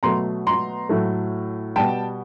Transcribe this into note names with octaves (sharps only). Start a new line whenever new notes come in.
B2 F#3 A3 A#5 C6
A#5 C6
A2 F#3 A3
B2 G3 G5 A5